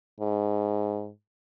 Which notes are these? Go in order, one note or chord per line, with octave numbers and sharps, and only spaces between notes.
G#2